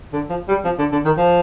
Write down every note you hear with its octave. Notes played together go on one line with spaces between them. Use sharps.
D3
F3
G3
F3
D3
D3
D#3
F3